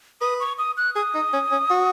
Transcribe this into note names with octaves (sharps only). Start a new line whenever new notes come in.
B4 D#6
C#6
D#6
F#6
G#4 D#6
D#4
C#4
C#4
F#4